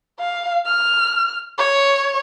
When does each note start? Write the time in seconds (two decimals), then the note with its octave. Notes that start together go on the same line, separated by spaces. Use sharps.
0.19 F5
0.66 F6
1.58 C#5